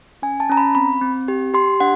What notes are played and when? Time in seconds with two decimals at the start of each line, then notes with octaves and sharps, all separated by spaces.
0.22 C#4 G#5
0.40 A5
0.49 C#4 A#5
0.57 B5
0.75 C4 B5
1.01 C4
1.28 G4
1.54 G4 C6
1.80 D4 F#5